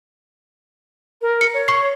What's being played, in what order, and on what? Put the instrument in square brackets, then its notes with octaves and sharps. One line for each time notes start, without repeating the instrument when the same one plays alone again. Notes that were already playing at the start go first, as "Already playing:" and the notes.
[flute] A#4
[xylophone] C#7
[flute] C#5
[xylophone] C#6 C7